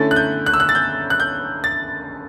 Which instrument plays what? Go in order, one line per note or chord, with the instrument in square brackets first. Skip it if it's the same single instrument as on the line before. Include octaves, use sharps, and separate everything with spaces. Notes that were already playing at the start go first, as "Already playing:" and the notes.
Already playing: [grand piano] D3 A3 C#4 E4 A6
F#6
G6
F#6
E6
F#6
A6
G6
F#6
G6
A6